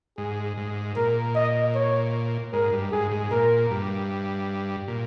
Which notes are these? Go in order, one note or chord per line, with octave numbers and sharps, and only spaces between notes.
G#2 G#4
G#2
A#2 A#4
D#5
C#5
G#2 A#4
G2
G#2 G#4
G#2
A#2 A#4
G2
A#2